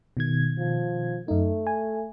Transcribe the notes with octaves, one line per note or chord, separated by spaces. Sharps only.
B2 D#3 G#6
F3
F#2 A3 D#4
G#5